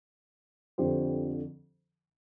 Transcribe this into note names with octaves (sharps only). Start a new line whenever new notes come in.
F2 D3 F3 G4 C5